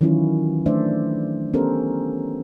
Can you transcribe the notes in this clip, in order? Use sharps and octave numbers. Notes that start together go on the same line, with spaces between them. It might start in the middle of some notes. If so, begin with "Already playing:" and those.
D#3 E3 F#3 C#4 E4 F4
A3 D4 B4 C5 D5 E5
B3 C#4 G4 A4 A#4 C5